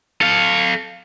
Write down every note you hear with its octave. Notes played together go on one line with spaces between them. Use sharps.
A4 F5